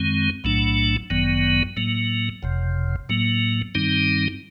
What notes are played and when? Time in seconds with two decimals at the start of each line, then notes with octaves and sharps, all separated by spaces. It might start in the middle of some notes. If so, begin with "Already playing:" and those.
Already playing: F#2 D#3 G#3 C4
0.44 B1 A2 F#3 A3 D4
1.10 G1 F#2 D#3 F#3 B3
1.77 A2 F#3 A#3
2.43 F#1 F2 C3
3.09 A2 F#3 A#3
3.75 G2 D#3 G3 C4 D#4